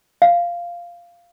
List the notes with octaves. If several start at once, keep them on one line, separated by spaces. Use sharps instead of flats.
F5